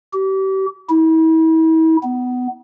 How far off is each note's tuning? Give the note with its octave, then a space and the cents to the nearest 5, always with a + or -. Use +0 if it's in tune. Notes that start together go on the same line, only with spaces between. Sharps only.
G4 -35
E4 -40
B3 +20